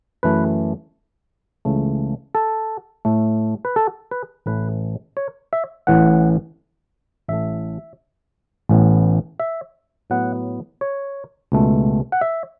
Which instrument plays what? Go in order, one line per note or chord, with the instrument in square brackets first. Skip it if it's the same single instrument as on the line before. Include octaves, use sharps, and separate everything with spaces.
[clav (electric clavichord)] F#2 E3 A3 B4
C#2 C#3 E3 A3
A4
A2 A3
B4
A4
B4
A1 A2 E3 A3 B4
C#5
E5
A1 A2 E3 A3 F#5
A1 A2 A3 E5
A1 A2 E3 B3
E5
A2 F#3 B3 F#5
C#5
C#2 B2 A3
F#5
E5